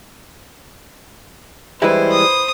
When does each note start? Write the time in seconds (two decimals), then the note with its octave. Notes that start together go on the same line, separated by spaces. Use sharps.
1.82 E3 G3 G#3 E4 B4 C5
2.12 D#6